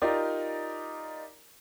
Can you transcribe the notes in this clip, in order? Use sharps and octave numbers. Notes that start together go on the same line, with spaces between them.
D#4 F4 G4 A#4 D5